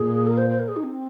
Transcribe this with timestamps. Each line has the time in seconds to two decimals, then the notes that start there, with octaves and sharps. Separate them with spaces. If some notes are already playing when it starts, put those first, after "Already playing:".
Already playing: A#2 G#4
0.27 A#4
0.37 C5
0.49 C5
0.59 A#4
0.68 G#4
0.76 D#4
0.84 C4